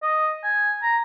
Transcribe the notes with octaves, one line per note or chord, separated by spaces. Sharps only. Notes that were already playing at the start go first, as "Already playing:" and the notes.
D#5
G#5
A#5